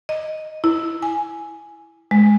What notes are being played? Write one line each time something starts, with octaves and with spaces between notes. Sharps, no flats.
D#5
E4
G#5
G#3